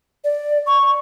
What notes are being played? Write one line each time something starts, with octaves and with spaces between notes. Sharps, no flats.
D5
C#6